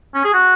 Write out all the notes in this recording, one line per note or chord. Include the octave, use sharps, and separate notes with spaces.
C#4
G#4
F#4